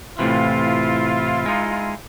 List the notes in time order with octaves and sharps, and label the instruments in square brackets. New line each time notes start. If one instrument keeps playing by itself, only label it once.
[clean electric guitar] A2 C3 E3 [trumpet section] E4 F4
[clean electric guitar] G#3 D#4